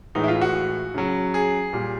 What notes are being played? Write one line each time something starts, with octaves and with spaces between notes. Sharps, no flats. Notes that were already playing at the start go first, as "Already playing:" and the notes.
A2 E3 G#3 D#4
E4
F4
F#4
C#3 F#3
G#4
A#2 G3